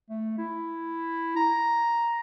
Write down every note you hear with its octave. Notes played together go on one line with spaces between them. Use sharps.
A3
E4
A#5